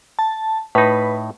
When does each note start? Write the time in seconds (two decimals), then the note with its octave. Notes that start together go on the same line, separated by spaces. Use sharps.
0.19 A5
0.75 A2 D#4 B4